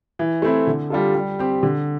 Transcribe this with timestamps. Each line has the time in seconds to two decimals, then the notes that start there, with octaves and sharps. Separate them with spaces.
0.19 E3
0.42 A3 C4 E4
0.67 D3
0.90 G3 D4 F4 A4
1.15 G3
1.39 C4 G4
1.63 D3